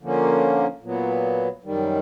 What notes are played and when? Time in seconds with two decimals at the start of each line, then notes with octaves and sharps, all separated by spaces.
0.01 D3 F3 A#3 C#4
0.82 A#2 F#3 B3
1.64 F#2 D#3 G3